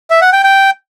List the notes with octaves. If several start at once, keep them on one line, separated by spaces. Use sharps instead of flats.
E5
F#5
G5
G5